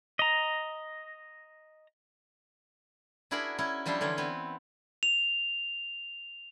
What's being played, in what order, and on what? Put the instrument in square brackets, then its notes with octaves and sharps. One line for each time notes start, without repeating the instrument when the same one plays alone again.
[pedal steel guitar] D#5 A#5
[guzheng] D4 E4 F#4 G#4 A#4 B5
C#4 E4 C#5
F3 G3 D4 E4 C5
D3 E3 C#4 C#5
B3 C4
[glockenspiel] F7